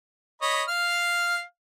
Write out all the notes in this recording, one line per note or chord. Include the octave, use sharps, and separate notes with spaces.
C#5 D#5 B5
F5 F6